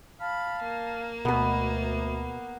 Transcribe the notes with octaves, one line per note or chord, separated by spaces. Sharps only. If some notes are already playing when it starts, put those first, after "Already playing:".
F5 A5 B5
A#3
D2 B2 B3 B4